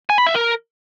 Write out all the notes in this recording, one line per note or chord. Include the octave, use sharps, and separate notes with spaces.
G#5
B5
E5
A#4